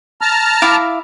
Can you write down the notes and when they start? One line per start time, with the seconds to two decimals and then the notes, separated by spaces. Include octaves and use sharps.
0.21 A5 A#5 F6
0.62 E4 F5 D6